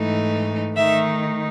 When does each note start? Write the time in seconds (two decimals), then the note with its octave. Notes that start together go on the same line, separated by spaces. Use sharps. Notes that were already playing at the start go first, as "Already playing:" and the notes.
Already playing: G#2 E3 A3 D#4
0.76 D#3 A3 D#4 E5